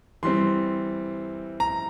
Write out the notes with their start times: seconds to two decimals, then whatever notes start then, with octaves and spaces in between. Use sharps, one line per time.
0.23 E3 G3 C4 C6
1.60 A#5